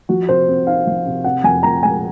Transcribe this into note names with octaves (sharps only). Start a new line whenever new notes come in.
F3 F#4
C3 C5
C4
D#4 F5
F3
C3
C3 F#5
F2 G#5
F3 A#5
G#3 G#5